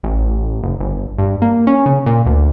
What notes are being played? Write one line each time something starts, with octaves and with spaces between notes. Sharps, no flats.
A1
F#1
G1
G2
A#3
C#4
C#3
A#2
D2